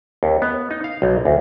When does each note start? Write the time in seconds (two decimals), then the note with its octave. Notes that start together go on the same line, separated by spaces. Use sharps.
0.23 D#2
0.42 B3
0.71 D#4
0.84 F5
1.02 B1
1.25 D2